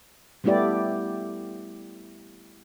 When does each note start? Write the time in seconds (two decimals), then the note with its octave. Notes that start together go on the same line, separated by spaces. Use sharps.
0.44 G3 A3 B3 E4 G4 D5